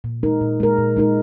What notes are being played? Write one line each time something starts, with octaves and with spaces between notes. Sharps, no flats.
A#2
G#3 D#4 A#4
A#2
G#3 D#4 A#4
A#2
G#3 D#4 A#4